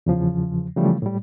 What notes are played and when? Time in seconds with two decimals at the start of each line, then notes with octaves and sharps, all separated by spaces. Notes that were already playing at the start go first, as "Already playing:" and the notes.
0.06 E2 C#3 F3
0.76 C#3 E3 F3 G3 A3
1.02 A2 G3